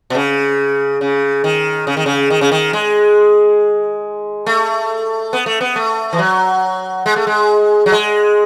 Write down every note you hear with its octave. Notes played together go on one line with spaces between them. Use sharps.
B2
C#3
C#3
D#3
C#3
D#3
C#3
D#3
C#3
D#3
G#3
A3
B3
A3
B3
A3
E3
F#3
G#3
A3
G#3
F#3
G#3